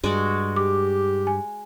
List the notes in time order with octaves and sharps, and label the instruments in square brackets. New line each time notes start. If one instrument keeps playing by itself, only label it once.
[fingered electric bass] G2 [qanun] G#3 F#4 D5
[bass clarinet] G4 [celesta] D6
[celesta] G#5